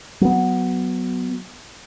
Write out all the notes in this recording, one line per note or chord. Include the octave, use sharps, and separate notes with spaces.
F#3 B3